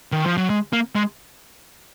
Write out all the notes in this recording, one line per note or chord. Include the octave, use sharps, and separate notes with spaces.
D#3
F3
F#3
G#3
A#3
G#3